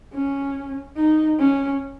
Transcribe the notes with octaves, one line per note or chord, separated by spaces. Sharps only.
C#4
D#4
C#4